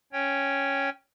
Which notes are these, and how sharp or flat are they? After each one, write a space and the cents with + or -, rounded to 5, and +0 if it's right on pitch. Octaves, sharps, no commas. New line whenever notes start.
C#4 +0 C#5 +0 G5 +0